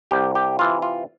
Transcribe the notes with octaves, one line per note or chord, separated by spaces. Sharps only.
C2 G4
G4
C3 E3 F4
F4